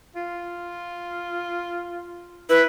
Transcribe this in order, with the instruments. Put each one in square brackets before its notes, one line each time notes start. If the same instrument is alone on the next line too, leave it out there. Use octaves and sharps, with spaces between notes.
[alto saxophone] F4
[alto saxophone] E4 [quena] B4